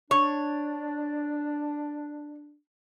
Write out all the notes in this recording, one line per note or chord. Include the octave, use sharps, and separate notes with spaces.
D4 C#5